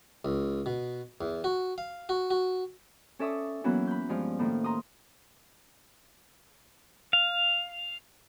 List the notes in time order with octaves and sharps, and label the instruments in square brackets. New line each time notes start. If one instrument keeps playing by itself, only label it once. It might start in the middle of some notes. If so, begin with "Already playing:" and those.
[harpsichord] C#2
B2
E2
F#4
F5
F#4
F#4
[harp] C#4 A4 D5 E5 C#6 D#6
E3 F#3 A#3 B3 C#4 E4
B5 G6
G2 F3 G#3 F5
A2 D#3 A#3
A#5 C6 D#6
[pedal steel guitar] F5